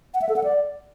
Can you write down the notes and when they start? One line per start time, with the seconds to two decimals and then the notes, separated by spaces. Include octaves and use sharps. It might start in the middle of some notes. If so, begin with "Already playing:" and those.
0.14 F#5
0.22 E5
0.29 A4
0.36 F#5
0.44 D5